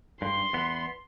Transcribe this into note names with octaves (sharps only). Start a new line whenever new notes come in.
G2 C6
E2 B3